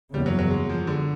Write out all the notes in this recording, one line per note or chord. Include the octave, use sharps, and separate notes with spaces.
F#1 E2 C#3 G3
F#3
F#3
G#3
F3
D3